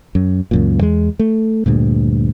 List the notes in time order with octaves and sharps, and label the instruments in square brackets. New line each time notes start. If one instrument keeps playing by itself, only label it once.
[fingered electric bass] F#2
C#2 F#2 A#2
E2 G#3
A3
D2 G2 A#2